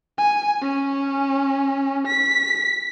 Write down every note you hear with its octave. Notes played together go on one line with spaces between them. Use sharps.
G#5
C#4
B6